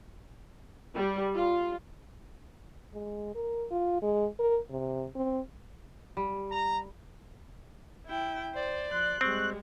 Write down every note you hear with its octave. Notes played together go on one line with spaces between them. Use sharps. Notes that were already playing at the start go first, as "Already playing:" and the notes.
G3
F4
G#3
A#4
F4
G#3
A#4
C3
C4
G3
A#5
E4 G5
C5 D5
F3 C6 F#6
G3 G#3 C4 C#6